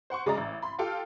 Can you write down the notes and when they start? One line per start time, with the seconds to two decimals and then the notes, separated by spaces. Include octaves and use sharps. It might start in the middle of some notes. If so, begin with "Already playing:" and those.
0.10 C5 F#5 C6 C#6
0.26 C#3 G#3 D5 D#5 A#5 A6
0.37 A1
0.62 B5 C6
0.79 F4 G4 A4 F5 G5